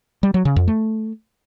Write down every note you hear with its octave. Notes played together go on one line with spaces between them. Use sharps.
G3
F#3
C#3
F2
A3